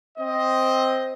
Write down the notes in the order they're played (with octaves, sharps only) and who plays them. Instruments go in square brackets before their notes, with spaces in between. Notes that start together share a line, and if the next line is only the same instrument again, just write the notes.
[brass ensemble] C4 D#5